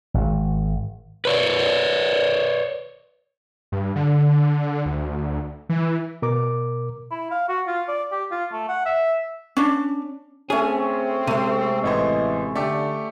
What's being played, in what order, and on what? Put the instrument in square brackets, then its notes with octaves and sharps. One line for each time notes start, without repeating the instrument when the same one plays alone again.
[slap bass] G#1
[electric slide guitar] B4 C#5 D5
[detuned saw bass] G2
D3
D2
E3
[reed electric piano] B2 A#4 D6
[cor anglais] E4
F5
F#4
F4
D5
G4
F4
A3
F#5
E5
[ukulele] C#4 D4
[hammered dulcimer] A3 C#4 [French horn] C4 [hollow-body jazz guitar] G#4
[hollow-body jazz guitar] C3 G#3 [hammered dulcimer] A3 [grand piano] D#7
[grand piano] A1 E3 C5 [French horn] D#5
[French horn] D3 [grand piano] A3 G4 [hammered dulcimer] D5